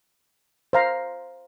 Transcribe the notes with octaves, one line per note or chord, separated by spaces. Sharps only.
C5 F5 A#5